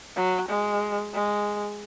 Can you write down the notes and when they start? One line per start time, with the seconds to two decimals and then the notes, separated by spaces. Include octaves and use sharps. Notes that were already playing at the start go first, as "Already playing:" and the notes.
0.16 F#3
0.49 G#3
1.14 G#3